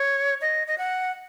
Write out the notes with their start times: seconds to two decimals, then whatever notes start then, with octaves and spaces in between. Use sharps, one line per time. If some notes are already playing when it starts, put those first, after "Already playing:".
Already playing: C#5
0.41 D#5
0.67 D#5
0.78 F#5